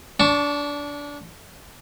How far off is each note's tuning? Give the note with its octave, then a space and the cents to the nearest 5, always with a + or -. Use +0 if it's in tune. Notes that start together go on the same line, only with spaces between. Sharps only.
D4 -25 A5 +0 C#6 +0